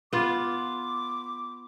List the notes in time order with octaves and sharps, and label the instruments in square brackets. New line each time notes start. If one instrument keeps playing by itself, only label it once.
[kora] B3 F4 [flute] D6